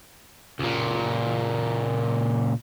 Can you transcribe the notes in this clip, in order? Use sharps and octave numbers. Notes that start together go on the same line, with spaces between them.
C#2 A#2